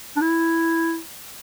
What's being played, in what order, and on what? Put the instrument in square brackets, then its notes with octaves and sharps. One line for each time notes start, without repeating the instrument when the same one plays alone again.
[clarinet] D4
E4